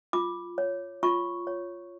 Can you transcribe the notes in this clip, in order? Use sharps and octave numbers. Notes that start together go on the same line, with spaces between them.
F4 D6
C#5
F4 C#6
C#5